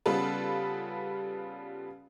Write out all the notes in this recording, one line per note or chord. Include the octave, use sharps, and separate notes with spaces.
C#3 G3 B3 F4 A4 B4